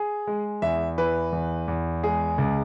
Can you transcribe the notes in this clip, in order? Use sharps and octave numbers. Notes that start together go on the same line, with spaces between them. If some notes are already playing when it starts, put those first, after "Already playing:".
Already playing: G#4
G#3
E2 E5
E3 B4
E2
E2
G#3 G#4
C#2